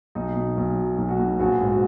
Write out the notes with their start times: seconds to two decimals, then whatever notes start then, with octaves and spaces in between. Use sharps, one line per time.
0.15 B1 D#4
0.36 B2
0.57 B1
0.78 F#3
0.98 B1
1.09 F#4
1.19 B2
1.39 A#1 F#4
1.61 G#2
1.71 F#4